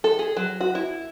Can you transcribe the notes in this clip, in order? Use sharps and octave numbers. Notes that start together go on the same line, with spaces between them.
A4
G#4
F#3
F#4
E4